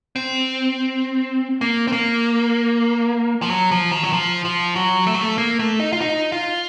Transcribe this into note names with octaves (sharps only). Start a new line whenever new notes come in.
C4
A#3
C4
A#3
F3
F#3
F3
D#3
F#3
F3
F3
F#3
A3
F#3
A3
A#3
A3
D#4
F4
D#4
F4